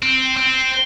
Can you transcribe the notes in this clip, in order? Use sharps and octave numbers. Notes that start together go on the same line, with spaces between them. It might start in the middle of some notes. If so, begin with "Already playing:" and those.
C4
C4